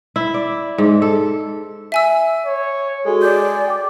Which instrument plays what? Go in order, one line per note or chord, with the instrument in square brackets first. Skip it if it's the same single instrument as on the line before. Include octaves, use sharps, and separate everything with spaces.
[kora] E4
D5
G#2
A4
[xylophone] E5 G#5 E6
[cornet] C#5
[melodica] G#3 [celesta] F#4 G#4 A4
[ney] D5 [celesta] D6 G6
[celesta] G5 D6